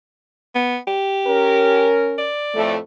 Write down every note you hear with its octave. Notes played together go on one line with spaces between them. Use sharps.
B3
G4
C#4 A#4
D5
F2 A2 A3